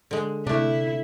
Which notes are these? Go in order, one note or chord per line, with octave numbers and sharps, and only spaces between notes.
D3 G#3
C3 A3 D4 E4